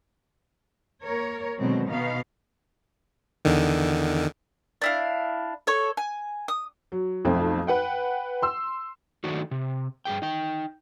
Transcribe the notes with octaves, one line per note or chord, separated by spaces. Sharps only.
A#3 A#4 C#5
B2 D3 D#3 F#3 G#3 C4
B2 B3 D#4 F5
E2 D3 D#3
D4 E4 F5
A4 C#5 C#6
G#5
D#6
F#3
B1 F2 A3 C4
B4 F#5 G5
C6 E6
D#3 F#3 A3 D4 D#4 F#4
C3
G2 A#2 G#4 G5
D#4 G5